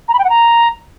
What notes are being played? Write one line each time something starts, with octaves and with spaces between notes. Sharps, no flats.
A#5
B5
G5
F#5
A#5